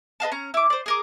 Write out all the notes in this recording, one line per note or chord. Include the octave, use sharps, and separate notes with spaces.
B4 D#5 F5 A5
C#4 A#5
E4 D6
C5 D5
G#4 A#4 D6